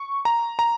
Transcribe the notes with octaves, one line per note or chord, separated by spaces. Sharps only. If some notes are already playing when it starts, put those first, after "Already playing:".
Already playing: C#6
A#5
A#5